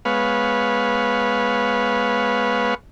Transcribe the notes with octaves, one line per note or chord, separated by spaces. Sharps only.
G#3 B3 B4 C#5 F5